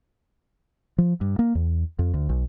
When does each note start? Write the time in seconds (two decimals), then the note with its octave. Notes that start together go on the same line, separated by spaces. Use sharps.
0.98 F3
1.21 G2
1.39 A#3
1.55 E2
1.99 F2
2.14 D2
2.29 B1